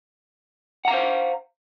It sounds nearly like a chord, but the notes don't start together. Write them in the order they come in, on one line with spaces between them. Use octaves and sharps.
F#5 A#5 F5 C5